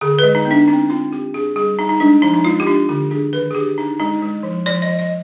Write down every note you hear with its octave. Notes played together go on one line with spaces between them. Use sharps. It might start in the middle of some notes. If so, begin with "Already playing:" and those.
D3 G#4
G#3 B4
D#4
B3
D4
C4 D#4
C4 F4
C4 G4
D4 G#4
G3 G#4
G3 D#4
D#4
G#3 D4
F3 D#4
D#4
G#3 F4
G4
D4 F4
D3 G4
D4 G#4
D#3 B4
G#4
D4 G4
D4 D#4
G#3 D#4
G#3
F3
F3 D5
D#5
F3
D#5